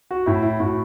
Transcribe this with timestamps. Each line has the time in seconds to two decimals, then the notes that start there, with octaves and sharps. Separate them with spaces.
0.11 F#4
0.26 A2 E4
0.43 E4
0.60 A2 F#4